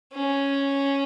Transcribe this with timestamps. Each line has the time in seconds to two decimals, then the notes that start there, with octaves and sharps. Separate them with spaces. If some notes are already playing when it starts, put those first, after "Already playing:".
0.13 C#4